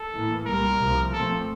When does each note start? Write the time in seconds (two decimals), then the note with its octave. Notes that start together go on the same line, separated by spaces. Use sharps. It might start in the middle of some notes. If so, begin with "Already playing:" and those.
Already playing: A4
0.13 A2 E3 A#3
0.46 C2 A#2 G3 A#3 A#4
0.79 C2 C3 F3
1.12 A#2 F3 A3 C4 A4